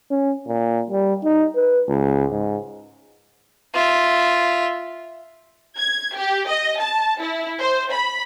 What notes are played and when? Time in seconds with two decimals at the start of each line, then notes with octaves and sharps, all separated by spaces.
0.10 C#4
0.47 A#2
0.90 G3
1.24 D#4
1.56 B4
1.88 C#2
2.31 G#2
3.74 F4 E5
5.78 G#6
6.16 G4
6.49 D#5
6.81 A5
7.22 E4
7.61 C5
7.93 B5